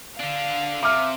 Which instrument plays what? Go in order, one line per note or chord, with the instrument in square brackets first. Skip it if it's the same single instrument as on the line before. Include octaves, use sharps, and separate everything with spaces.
[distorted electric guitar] D3 D4 [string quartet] F5
[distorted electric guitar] C3 [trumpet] E5 [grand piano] D6 F6